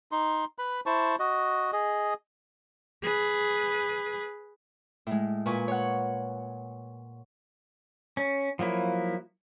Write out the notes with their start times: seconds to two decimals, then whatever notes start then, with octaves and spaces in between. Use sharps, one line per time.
0.12 D#4 C6
0.58 B4 B5
0.86 E4 C5 A5 C#6
1.19 F#4 D#5
1.73 G#4 D#5
3.03 G#4 B4
5.07 A2 G#3
5.46 A#2 B4 G#5 C#6
5.68 C#5 F#5
8.17 C#4
8.59 F3 F#3 A#3 E4